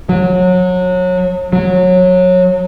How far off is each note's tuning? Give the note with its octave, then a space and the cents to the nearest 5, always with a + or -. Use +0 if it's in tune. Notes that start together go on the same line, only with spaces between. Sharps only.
F#3 -25
F#3 -20